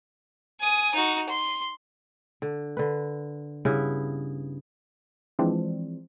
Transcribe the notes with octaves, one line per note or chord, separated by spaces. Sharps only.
G#5 D#6
D#4 F#4
C6
D3
D3 B4
G2 C#3 B3 E4
E3 F3 G#3 C4 D4